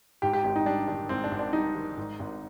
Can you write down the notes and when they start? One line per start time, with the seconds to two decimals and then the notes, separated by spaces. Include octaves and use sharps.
0.22 G#2 G4
0.33 G4
0.44 G#1 G4
0.56 D#4
0.65 G3 D4
0.88 D#3 D4
1.09 G#2 C4
1.24 D4
1.31 G#1
1.39 D4
1.53 G3 D#4
1.75 D#3
1.97 G#2
2.19 G#1